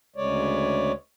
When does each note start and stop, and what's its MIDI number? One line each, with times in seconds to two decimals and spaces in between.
0.16 0.92 38
0.16 0.92 49
0.16 0.92 56
0.16 0.92 73
0.16 0.92 74